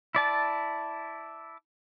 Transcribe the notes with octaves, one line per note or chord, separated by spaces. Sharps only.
E4 D5 A5